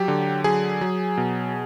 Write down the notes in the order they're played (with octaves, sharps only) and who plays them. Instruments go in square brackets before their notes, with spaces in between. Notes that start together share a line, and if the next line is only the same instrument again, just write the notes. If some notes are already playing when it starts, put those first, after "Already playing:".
Already playing: [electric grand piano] F#3 G4
D3
F#3 G#4
F#3
B2